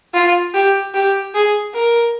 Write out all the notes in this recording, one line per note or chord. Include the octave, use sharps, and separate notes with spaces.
F4
G4
G4
G#4
A#4